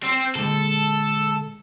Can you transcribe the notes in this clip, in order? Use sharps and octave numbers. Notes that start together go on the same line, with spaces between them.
C4 E6
A#2 D3 G#3 A4